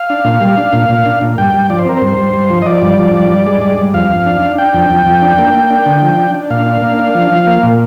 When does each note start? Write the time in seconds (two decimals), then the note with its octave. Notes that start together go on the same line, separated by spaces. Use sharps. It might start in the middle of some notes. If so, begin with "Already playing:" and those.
Already playing: F5
0.10 D4
0.25 A#2
0.41 G3
0.57 D4
0.73 A#2
0.89 A#2
1.06 D4
1.21 A#2
1.38 G2 G5
1.54 G2
1.70 F3 D5
1.79 C5
1.85 C4 A#4
1.97 G2 C5
2.18 G2
2.33 G2
2.50 F3
2.62 D#5
2.66 F3 D5
2.82 G2
2.98 F3
3.14 G2
3.30 G2
3.46 G#3
3.61 G2
3.78 G2
3.94 F2 F5
4.10 F2
4.26 D4
4.42 D4
4.58 D4 G5
4.74 F2
4.90 F2
5.06 F2
5.22 D4
5.38 A#3
5.54 A#3
5.70 D4
5.86 D3
6.02 F3
6.18 D4
6.34 D4
6.50 A#2 F5
6.66 D4
6.82 A#3
6.99 D4
7.15 F3
7.32 F3
7.47 A#3
7.63 A#2